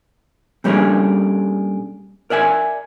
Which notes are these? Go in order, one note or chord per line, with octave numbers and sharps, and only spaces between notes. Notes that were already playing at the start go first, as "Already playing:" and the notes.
A#2 G3 A3 C#4 D4 G#4
A#4 D5 E5 G#5